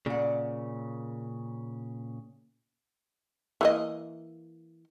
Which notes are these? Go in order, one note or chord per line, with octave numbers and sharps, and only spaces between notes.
A#2 C#3 D5 F#5
E3 A#3 D#5